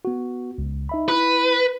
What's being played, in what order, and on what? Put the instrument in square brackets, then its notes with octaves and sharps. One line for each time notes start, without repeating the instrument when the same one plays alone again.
[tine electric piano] B3 F#4
C#2
D#4 E5 B5
[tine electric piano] E4 [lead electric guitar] B4